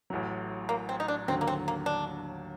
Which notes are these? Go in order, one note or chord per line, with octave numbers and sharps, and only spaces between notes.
A1 A2 F#3
A#3
C4
D#4
D4
D#2 D3 F#3 C4
A#3
C4
A#3
D4